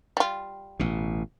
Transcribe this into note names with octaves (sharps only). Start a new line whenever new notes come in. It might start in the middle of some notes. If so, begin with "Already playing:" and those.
G3 F4
A1 B2